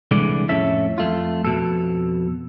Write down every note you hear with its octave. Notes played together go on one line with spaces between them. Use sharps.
C2 D3 E3 G#3 D5
F2 A2 C#4 A4 E5
F2 A3 F4
F2 B2 A4